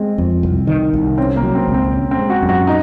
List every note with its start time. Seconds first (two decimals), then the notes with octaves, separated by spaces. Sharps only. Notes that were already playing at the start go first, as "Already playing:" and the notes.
Already playing: G#3 C4
0.18 F2
0.43 C2
0.67 D#3
0.94 C2
1.18 C4 C#4
1.36 A#3
1.43 F#3
1.55 C4
1.68 C#2
1.74 C4
1.93 C#4
2.11 C4
2.18 G#3
2.30 F#4
2.42 F#2
2.49 F#4
2.67 D#4